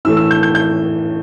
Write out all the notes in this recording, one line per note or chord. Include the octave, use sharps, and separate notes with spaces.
A2 E3 A3 E6
E6
G6
G6
G6